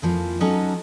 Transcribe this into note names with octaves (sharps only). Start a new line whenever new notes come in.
F2 E3 F3 A#3
F#3 C#4 D#4 A4 D#5